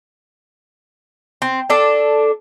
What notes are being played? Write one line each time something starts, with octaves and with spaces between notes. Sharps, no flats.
C4
D4 A4